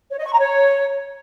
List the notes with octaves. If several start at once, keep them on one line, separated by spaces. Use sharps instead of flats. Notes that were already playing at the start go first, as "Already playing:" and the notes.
C#5
D#5
C#6
A#5
C#5